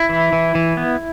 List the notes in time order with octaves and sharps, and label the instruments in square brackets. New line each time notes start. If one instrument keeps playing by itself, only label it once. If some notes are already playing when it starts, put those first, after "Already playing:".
Already playing: [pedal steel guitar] E4
E3
E3
E3
B3